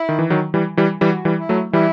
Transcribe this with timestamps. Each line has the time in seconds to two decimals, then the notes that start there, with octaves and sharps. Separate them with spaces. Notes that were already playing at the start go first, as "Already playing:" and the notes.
Already playing: E4
0.09 D#3
0.19 E3
0.30 D#3 F#3
0.54 E3 G3
0.77 E3 G3
1.01 E3 G3 F#4
1.25 E3 G3
1.37 E4
1.49 F#3 A3
1.73 E3 G3 E4